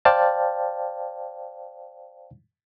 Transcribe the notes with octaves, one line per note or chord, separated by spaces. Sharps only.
C5 D5 F5 G5 A5